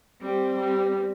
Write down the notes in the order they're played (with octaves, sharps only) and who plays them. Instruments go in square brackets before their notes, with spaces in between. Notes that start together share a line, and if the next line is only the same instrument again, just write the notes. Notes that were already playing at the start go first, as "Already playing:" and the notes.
[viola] G3 [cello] C4
[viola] G3